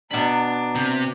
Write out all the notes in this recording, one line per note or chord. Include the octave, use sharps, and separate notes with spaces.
B2 D4 A#5 B5
C3